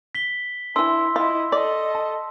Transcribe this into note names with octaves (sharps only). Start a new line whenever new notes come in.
B6 G7
E3 D4 E4 C6 E6
E4 F4 D#5
A4 D5 D#5
A5